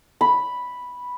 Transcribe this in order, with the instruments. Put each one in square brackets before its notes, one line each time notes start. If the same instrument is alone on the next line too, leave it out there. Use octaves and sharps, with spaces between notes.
[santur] B5